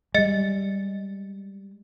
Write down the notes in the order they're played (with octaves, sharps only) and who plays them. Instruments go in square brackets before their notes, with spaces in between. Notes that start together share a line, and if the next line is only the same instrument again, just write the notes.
[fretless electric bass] G3 G#3 [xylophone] D#5 A6 C#7